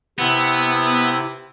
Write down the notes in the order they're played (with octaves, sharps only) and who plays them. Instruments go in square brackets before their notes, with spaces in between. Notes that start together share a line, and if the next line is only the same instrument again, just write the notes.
[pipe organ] C3 E4 [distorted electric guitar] B3